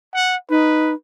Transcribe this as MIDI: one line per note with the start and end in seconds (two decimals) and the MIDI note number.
0.14 0.36 78
0.50 0.94 63
0.50 0.93 71